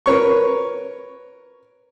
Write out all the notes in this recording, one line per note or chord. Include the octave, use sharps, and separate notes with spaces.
A#4 B4 C#5 C#6